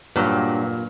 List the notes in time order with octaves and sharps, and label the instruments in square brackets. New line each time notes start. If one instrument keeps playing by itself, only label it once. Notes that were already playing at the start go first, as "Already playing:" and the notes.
[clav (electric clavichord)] G2 F#3 [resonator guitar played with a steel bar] A#2